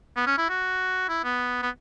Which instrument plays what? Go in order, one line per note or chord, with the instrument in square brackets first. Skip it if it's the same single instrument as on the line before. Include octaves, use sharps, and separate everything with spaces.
[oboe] B3
C#4
E4
F#4
E4
B3
B3